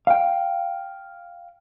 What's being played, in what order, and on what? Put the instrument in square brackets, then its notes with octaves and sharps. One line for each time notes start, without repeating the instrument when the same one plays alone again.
[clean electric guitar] F5 G5